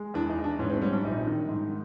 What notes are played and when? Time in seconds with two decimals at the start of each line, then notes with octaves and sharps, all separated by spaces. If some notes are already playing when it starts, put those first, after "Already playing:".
Already playing: G#3
0.14 E2 D4
0.30 D#4
0.37 E3
0.44 D4
0.59 G#2 C#4
0.70 C4
0.82 G3 C#4
0.93 D4
1.04 A#1 D#4
1.27 D#3
1.49 G#2